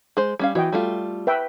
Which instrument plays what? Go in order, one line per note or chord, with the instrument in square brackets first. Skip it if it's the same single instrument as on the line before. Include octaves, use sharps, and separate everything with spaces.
[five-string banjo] G#3 C5
G3 C#4 F5
[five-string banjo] E3 [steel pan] F#4 D#5 G5
[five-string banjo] G3 A3 F4
[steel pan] B4 E5 G5